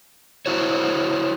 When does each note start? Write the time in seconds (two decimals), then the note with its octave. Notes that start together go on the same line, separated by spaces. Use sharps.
0.46 E4 F#4 C5 C#5